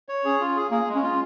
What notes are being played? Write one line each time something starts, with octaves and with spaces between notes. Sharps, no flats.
C#5
C#4 G#4
F4
G#4
A#3 G#4
G#3
C#4
F4